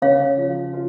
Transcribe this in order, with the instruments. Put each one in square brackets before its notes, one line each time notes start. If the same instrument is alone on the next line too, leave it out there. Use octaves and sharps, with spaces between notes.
[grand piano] C#3 [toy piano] C#5 F5
[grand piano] F3
F4